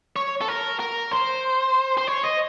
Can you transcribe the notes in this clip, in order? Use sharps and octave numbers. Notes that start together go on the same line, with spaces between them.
C#5
A4
A#4
A#4
C5
C5
C#5
D#5